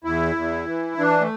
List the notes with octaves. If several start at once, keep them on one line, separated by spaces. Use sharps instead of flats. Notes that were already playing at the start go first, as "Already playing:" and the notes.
E2 E4
E2
E3
E3 D4
A3